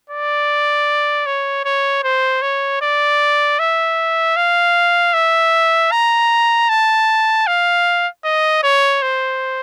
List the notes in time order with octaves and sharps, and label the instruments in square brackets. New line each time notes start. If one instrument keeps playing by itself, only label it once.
[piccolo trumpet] D5
C#5
C#5
C5
C#5
D5
E5
F5
E5
A#5
A5
F5
D#5
C#5
C5